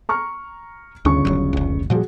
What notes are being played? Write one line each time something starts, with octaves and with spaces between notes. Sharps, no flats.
A#5 C#6 F6
G1 D2 C#3 C#6
D#1 D#2 F#3
F1 C#2
A#2 F3 G3 F#4 G#4